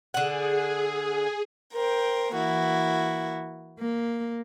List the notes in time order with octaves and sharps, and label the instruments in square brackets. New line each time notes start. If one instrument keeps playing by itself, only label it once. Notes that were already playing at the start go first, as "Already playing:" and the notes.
[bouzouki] D3 F#5 [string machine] G#4
[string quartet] A#4 C5 G5
E3 A#3 E4 F#4
A#3